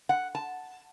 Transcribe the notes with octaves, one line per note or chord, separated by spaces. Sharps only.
F#5
A5